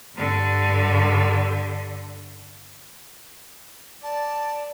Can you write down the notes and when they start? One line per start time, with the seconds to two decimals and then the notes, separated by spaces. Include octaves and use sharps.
0.16 G2 D3
4.03 D5 A5